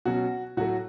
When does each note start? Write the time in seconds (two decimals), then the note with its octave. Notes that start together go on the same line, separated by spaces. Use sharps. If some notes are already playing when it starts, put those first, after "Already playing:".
0.05 B2 F#3 C#4 F#4
0.57 A2 F#3 A3 F#4